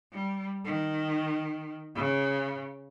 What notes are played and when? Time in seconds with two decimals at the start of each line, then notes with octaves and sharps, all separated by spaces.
0.13 G3
0.65 D#3
1.96 C#3